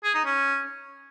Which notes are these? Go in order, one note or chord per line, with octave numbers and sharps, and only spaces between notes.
G#4
D#4
C#4